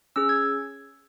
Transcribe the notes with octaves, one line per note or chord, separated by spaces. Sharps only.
C#4 G#4 E6
G#6